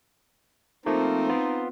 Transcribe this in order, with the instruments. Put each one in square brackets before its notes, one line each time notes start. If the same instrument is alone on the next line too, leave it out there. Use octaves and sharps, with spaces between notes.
[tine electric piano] F3 A3 A#3 [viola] C4 [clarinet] D#4
[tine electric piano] B3 F4